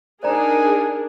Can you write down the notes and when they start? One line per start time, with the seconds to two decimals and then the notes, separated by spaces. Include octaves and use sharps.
0.23 D4 D#4 G#4 A#4 C5 D5 G#5 A#5